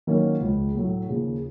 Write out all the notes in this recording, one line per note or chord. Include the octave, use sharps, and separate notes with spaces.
D#3 F#3 A#3 C#4
C#2 C#3 F3
A2 F#3 A3
D#2 C#3 F3